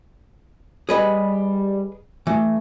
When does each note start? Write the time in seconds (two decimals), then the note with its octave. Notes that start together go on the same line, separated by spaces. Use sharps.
0.89 G3 G#4 B4 D#5
2.27 E3 A3